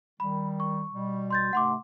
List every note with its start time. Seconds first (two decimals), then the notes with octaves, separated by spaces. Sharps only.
0.20 D#3 G3 B5
0.60 C#6
0.90 B2 G3
1.30 C6 G6 A6
1.53 G#2 C3 A3 F#5 C6 D6